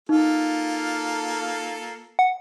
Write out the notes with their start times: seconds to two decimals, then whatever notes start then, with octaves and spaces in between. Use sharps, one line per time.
0.09 A#3 D#4 F4 A4
2.19 F#5